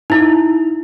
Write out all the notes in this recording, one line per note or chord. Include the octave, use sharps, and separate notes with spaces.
D#4 E4